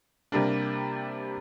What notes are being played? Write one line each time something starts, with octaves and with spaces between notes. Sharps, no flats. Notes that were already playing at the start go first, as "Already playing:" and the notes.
C3 G3 A#3 D4